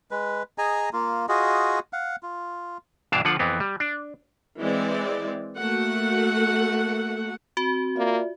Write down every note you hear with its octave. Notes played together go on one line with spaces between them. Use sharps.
G#3 B4
G#4 D#5 G#5 A#5
A#3 F4
F4 F#4 G#4 D#5
F5 F#5
F4
G2 B2 E3 D4 F5 A5
D3 F3 F4 F#5
F2 E3 B3 C4
G3
D4
E3 G#3 C4 D5
A3 A#3 F#4 F#5
C4 F#4
A#3 F4 D5 E5